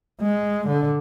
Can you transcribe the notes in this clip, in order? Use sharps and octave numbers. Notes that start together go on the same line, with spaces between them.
G#3
D3